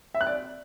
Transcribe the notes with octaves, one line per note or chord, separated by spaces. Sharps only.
E5
F#6
D5